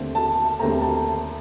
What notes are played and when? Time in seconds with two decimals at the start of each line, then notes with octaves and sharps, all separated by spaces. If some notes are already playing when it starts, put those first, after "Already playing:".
Already playing: D#2 D3 A3 C4
0.15 A5
0.59 D#2 D3 A3 C4 A#5
0.81 A5